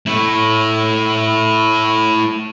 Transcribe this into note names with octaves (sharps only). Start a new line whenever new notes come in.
A3 E4